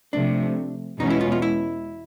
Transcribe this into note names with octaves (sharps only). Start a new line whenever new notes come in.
C3 F3 A3 D4
E2 B2 G#3 C#4 D#4
E4
F4
F4
E4